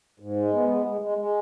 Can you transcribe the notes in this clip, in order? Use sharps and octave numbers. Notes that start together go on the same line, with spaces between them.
G#2
G#3
B3
G#3
G#3
G#3
G#3